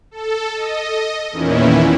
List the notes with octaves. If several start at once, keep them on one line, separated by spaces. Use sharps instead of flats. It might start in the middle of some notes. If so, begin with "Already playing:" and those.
A4
D#5
E2 A#2 D#3 E3 C#4 E4